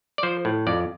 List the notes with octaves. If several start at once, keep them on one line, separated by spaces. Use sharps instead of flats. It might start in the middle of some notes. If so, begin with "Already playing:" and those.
D5
F3 C5
A2
F2 D5